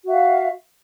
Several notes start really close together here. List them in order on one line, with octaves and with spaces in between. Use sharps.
F#4 E5 F5